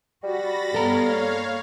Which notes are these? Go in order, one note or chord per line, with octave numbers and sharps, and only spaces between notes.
G3 F#4 B5 A6 A#6
G2 B3 A4 C#5 F5 A#5
A#3